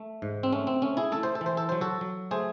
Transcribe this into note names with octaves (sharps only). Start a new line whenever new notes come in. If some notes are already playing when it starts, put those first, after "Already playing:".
Already playing: A3
G#2
C4
A3 C#4
C4
A3 C#4
E4 G#4
A3 A4
C5
A4
E3
C5
A4
F#3 C5
F#4 A4
F#3
A3 G#4 C5